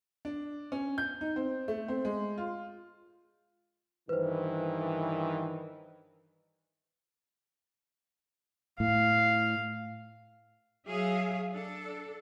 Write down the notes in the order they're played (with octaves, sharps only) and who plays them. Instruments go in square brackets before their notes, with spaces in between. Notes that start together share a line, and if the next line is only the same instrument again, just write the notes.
[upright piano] D4
C#4
G6
D#4
C4
A3
C4
G#3
F4
[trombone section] G2 D#3 E3 [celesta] B4 C5
[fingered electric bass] A2 [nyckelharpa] F5
[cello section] F#3 G#4 E5 F5
D4 A4